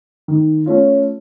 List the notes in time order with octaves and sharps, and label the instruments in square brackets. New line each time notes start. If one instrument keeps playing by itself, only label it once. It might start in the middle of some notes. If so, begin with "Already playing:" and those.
[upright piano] D#3
A3 C#4 F4